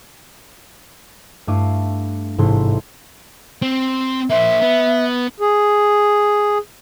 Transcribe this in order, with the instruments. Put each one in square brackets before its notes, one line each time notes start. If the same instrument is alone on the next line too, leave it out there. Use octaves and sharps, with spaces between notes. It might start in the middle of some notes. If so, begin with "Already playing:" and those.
[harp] G2 A3 E4 F5 D6 D#7
A1 G#2 C3 A3 E4 C6
[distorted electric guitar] C4
[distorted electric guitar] A#3 C5 [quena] E5
[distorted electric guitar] B3
[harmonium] G#4